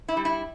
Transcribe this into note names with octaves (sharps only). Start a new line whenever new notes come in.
E4
G3
E4